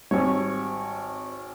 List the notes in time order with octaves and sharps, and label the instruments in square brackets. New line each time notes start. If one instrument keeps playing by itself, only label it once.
[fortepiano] G#1 C#5 [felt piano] G3 C4